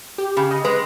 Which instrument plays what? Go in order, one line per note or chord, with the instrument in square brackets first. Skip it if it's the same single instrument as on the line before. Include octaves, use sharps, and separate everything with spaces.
[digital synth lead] G4
[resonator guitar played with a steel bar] C#3
[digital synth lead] D#5
[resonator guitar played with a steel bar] G#3 [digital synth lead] B4